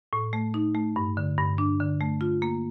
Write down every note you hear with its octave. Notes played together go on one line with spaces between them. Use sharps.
A2
A3
D#4
A3
G2
D3
G2
D4
D3
A3
F4
A#3